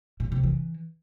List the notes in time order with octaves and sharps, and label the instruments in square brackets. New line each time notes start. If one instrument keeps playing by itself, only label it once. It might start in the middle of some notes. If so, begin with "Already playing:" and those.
[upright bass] A#2
C3
E3